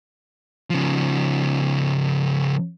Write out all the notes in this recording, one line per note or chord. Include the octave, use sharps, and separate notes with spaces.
C#3 F3